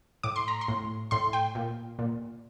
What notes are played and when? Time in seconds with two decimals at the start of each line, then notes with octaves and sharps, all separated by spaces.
0.23 A2 D6
0.36 C6
0.48 A#5
0.61 C6
0.68 A2
1.11 A2 C6
1.33 G5
1.55 A#2
1.99 A#2